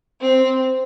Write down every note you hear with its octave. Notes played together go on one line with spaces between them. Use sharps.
C4